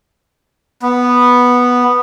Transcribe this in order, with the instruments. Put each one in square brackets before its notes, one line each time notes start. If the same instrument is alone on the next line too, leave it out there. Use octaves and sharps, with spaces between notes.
[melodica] B3